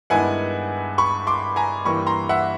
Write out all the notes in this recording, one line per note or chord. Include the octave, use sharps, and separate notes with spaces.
G2 D#3 G#3 B3 E4 F#5 G#5
B5 C#6
C6 D6
G#5 A#5
G2 E3 G3 A#3 B5 C#6
A#5 C6
E5 F#5